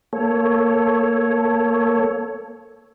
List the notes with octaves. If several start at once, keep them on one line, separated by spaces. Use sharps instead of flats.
A#3 A4 C#5